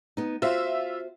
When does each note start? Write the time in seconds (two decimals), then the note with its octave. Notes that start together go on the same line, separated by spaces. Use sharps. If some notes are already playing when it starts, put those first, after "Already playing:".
0.17 B3 D#4
0.42 F4 F#4 C5 E5